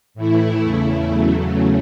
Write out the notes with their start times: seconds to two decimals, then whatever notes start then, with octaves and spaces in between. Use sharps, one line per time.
0.14 A2 E3 A3 E4
0.62 E2 C#3 A3 E4
1.10 E2 C#3 F#3 A3